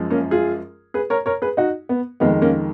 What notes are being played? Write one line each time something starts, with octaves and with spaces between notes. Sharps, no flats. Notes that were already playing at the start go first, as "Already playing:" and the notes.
Already playing: F#2 F3 G#3
A#3 C#4
F4 G#4
G#4 B4
A#4 C#5
A#4 C#5
G#4 B4
D#4 F#4
B3
F2 D#3 G#3 B3
A#3 C#4